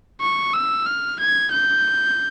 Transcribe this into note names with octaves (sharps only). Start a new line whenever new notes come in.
C#6
E6
F6
G#6
G6